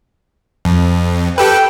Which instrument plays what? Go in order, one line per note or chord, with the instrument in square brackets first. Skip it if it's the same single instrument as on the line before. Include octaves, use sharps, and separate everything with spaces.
[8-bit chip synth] F2
[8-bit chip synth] G4 A4 B4 [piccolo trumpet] G5